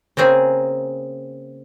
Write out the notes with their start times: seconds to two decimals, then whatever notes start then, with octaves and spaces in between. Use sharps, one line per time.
0.17 C#3 A#3 C4 G#4 G#5